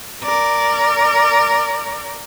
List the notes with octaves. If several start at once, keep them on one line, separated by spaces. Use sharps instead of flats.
A#4 D5